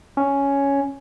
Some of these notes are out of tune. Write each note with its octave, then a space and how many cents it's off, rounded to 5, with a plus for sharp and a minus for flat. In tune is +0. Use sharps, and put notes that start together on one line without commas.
C#4 +5